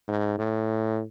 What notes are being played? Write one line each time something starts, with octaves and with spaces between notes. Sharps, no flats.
G#2
A2